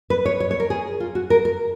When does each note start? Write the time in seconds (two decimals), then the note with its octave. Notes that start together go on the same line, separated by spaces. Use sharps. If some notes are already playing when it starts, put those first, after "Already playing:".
0.10 B4
0.26 C#5
0.40 C#5
0.51 C#5
0.60 A#4
0.70 G#4
1.00 F4
1.15 F#4
1.30 A#4
1.45 A#4